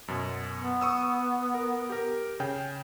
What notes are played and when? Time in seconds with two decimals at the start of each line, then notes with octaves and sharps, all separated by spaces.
0.08 F#2 B2
0.57 B3
0.81 C#6 D#6 E6
1.54 A#4
1.90 G4 A#4
2.40 C#3 G5